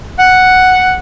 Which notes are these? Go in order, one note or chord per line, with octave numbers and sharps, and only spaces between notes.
F#5